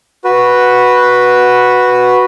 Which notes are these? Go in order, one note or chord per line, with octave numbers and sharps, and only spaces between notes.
F#4 B4